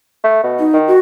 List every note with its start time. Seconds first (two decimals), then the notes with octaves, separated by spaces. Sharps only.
0.24 A3
0.44 B2
0.59 D#4
0.73 D#3
0.88 F#4